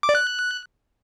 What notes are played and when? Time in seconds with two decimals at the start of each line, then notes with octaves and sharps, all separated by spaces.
0.03 D6
0.09 D5
0.15 F#6